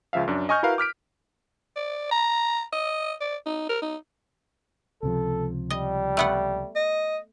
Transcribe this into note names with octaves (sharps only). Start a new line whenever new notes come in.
C#2 C#3 F3 E5 F5
F#2 D4
D#5 G#5 C#6 F6 G6
E4 F#4 A#4 B4 F5
D6 F6 B6 D7
D5
A#5
D#5
D5
D#4
A#4
D#4
C#2 C3 F3 A4
G3 D#5
A3 B3 F#5
D#5